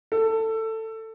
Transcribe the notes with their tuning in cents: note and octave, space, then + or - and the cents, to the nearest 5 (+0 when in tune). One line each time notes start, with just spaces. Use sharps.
A4 +15